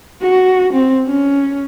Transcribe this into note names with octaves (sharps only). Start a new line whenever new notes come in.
F#4
C4
C#4